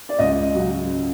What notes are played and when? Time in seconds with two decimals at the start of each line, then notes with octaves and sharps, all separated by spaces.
0.09 D5
0.19 C#2 D#5
0.55 C#3 F#3